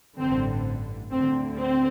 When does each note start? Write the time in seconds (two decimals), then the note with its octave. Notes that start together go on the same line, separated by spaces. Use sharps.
0.19 A1 G2 D3 C4
1.11 D2 D3 C4
1.58 C4